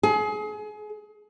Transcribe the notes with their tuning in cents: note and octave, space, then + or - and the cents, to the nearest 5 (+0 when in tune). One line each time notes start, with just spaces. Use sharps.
G#4 +30